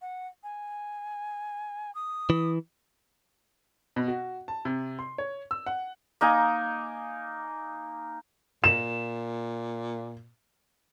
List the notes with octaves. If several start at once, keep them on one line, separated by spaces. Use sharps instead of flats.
F#5
G#5
D#6
E3
B2
F#4
A5
C3
C6
C#5
E6
F#5
A#3 D#4 G#5
A#2 E7